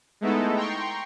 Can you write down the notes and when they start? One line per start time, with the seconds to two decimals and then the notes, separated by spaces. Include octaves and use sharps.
0.21 G#3 A3 B3 D#4 E4 A4
0.56 G5 A#5 C6 C#6